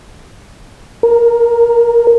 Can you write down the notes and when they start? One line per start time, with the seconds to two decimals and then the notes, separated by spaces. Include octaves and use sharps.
1.03 A#4